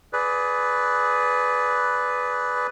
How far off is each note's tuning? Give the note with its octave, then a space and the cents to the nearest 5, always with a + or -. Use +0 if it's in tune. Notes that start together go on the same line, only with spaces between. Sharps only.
G#4 +20 B4 +5 D5 -10